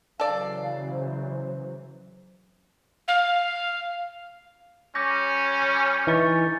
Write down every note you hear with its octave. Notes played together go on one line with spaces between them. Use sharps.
C#3 E3 F#3 A4 D5 F5
C5
F5
G3 C#4 D6 G6 A#6
G6 C#7
E3 D#4 G#5 C#6 A6